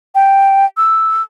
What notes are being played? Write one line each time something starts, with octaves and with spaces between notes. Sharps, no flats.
G5
E6